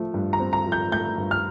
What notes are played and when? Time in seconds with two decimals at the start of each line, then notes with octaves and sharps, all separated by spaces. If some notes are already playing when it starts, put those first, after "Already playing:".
Already playing: F3 A3
0.14 G2
0.33 A#5
0.40 C4
0.53 A#5
0.66 F3
0.72 G6
0.92 A3 G6
1.18 G2
1.31 F6